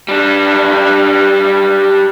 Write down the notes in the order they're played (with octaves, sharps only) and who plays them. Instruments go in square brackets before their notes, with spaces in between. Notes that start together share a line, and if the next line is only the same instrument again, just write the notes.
[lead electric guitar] G3 D4